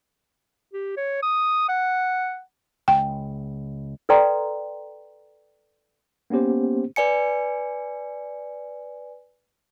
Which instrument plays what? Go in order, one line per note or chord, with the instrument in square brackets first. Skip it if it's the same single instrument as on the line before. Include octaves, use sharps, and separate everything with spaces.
[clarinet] G4
C#5
D#6
F#5
[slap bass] C#2 [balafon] G5
[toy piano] A4 B4 D5 G5 A#5 C6
[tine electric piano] A#3 B3 C#4 G4 C5
[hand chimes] B4 D5 G#5 C#7